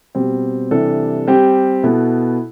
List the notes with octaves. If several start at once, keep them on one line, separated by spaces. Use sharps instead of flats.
B2 G3 C4
C3 E3 G3 D4 A4
G3 C4 G4
B2 B3 E4 A4